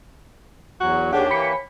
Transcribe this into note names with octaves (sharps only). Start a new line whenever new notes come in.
E2 F#3 F#4
D#2 D#3 D4 G4 G#4 C#5 F#5
E3 A#3 B5 B6 C#7